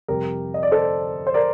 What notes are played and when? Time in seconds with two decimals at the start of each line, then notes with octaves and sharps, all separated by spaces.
0.08 F2 C3 G3 G4 A#4
0.54 D#5
0.63 D5
0.71 A4 C5
1.27 C5
1.34 A#4 D5